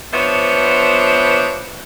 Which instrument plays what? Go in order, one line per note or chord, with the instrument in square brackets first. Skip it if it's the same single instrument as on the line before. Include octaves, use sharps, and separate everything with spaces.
[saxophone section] F3 B3 D4 C5 C#5 E5